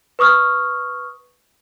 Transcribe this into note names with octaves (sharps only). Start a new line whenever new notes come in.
B4 C#6 D#6 F6